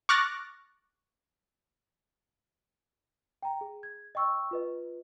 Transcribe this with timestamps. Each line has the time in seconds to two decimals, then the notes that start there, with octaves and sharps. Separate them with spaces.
0.09 C#6 D6 F6 F#6 A6 A#6
3.43 G5 A#5
3.61 G#4
3.83 G#6
4.15 D#5 G5 C#6 E6
4.51 F4 B4 D#5